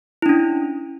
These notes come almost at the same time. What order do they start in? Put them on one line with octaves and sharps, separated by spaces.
E4 D4 C#4